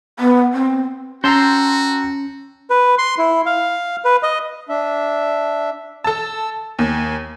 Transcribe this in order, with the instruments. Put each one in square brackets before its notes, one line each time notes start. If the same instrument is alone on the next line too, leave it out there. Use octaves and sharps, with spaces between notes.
[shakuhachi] B3
C4
[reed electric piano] C#4 [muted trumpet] F#4 [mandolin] G5 A5 C6 [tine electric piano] A#5 E6 G6
[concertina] B4
C6
E4
F5
B4
D#5
[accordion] D4 E5
[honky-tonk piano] A4 A5 [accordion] E6
[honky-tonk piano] D#2 [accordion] G#5